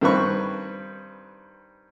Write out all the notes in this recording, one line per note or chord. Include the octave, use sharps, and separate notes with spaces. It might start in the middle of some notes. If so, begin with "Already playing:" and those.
G2 D#3 C4 B4 C#6